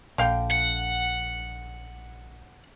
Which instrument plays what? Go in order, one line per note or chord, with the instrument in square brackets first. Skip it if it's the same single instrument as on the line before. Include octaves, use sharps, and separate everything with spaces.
[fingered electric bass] A#1 [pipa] D3 F5 G5
[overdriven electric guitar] F#5